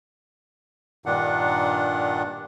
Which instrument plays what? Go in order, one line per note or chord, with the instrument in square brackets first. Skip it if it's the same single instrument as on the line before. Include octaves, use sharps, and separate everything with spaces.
[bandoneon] G2 A#2 D#3 D4 F#5